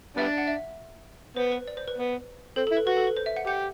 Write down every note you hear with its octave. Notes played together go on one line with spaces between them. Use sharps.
G3 B3 D4 E5
F#5
E5
B3 C5
B4
D5
C5
B4
B3
C4 A4
A4
E4
B4
F#4 B4
A4
B4
C5
E5
F#5
G4 F#5